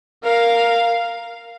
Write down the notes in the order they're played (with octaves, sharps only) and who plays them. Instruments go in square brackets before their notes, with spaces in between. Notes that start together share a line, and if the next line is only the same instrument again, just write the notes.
[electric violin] A#4 [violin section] F5